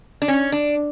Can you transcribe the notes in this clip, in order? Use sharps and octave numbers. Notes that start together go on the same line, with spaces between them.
D4
C#4
D4